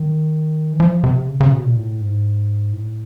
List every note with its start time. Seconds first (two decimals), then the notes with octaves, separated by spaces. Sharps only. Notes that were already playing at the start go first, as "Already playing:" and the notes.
Already playing: D#3
0.73 E3
0.80 F3
1.04 C3
1.28 C#3
1.40 C#3
1.52 B2
1.64 A#2
1.77 A2
2.01 G#2
2.73 A2